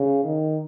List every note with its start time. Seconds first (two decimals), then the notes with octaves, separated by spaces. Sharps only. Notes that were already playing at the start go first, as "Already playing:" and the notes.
Already playing: C#3
0.24 D#3